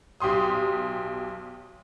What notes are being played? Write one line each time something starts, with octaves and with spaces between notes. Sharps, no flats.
B1 G4 C6 D#6